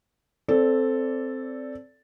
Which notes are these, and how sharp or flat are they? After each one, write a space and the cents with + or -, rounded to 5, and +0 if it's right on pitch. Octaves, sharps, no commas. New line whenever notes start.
C4 +0 A4 +0 D5 -20